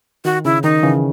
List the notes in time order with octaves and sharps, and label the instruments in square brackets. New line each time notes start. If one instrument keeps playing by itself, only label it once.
[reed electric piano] D#3 [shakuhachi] F#4
[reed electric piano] C#3 [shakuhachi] E4
[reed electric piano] D#3 [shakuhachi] D#4
[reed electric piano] C#3 E3